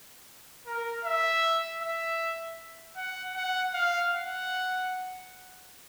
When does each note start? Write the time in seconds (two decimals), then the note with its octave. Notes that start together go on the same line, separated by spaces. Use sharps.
0.67 A#4
1.05 E5
1.81 E5
2.97 F#5
3.35 F#5
3.74 F5
4.12 F#5